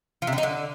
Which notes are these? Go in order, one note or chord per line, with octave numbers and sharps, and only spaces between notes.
F3
C3
D3
D#4
D3